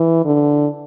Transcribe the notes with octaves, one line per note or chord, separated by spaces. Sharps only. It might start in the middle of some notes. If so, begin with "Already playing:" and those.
Already playing: E3
D3